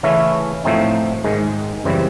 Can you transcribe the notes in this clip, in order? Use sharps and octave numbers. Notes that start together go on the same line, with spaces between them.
C#3 E3 A3 C#4 E4
A2 F3 A3 C4 D#4
G#2 D#3 G#3
F#2 C#3 E3 G3 C4